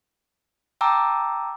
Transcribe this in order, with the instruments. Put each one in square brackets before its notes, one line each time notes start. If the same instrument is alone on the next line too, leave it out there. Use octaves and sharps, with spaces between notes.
[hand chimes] G5 A5 A#5 D6 E6